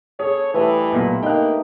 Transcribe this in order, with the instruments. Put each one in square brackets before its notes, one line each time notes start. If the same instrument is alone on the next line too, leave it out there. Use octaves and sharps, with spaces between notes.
[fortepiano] G#4 [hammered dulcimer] A4 [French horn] C#5
[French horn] E3 [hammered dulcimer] G3 A3 B4
[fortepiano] B1 A#2
[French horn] A#3 [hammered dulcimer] D#4 [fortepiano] G5 F#6